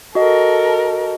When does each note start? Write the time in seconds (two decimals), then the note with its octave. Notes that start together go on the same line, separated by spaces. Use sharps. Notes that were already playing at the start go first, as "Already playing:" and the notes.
0.15 F#4 A4 A#4 D#5